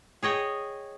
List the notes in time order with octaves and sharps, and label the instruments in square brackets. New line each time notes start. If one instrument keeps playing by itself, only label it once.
[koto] G#4 C#5 D#5 G5